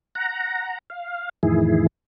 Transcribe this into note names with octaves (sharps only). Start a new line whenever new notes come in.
F#5 A#5
F5
F2 A2 D#3 E3 E4 G#4